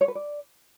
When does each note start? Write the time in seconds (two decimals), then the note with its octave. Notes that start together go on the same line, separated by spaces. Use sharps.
0.01 C#5
0.08 B4
0.15 D5